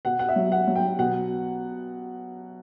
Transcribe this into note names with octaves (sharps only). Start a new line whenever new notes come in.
B2 F#5
F#5
E5
F#3
F#5
F#3
G5
B2 F#5